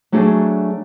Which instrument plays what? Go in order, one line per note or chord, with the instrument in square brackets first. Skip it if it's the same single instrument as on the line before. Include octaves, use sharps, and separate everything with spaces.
[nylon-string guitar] F#3 A3 D4 F#4 G#4